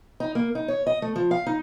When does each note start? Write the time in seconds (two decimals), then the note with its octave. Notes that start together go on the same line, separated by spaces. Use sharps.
0.20 D#4
0.35 A#3
0.55 D#4
0.68 C#5
0.87 D#5
1.02 A3
1.16 F3
1.31 F5
1.46 D#4